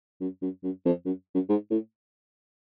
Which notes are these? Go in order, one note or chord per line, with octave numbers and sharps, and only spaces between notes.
F#2
F#2
F#2
F2
F#2
F#2
G#2
A2